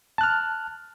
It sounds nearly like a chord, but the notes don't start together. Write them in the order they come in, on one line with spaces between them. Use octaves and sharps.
A5 F#6 F6